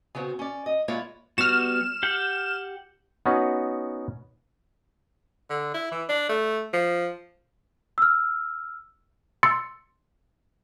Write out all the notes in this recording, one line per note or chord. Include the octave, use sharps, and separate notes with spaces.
C#3 B3 C4 F#4
C#4 D5
D#5
G#3 A#3 E4 F4 C#5 D5
G3 B3 F#4 F6 E7
G4 F#5 G5
B3 C#4 D#4 F#4
D3
E4
E3
D4
A3
F3
E6 F6
C6 E6 A6 C#7